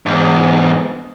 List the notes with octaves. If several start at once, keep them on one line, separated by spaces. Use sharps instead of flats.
E2 G#2